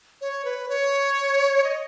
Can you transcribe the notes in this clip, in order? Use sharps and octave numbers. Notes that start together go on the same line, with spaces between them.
C#5
B4
C#5
D#5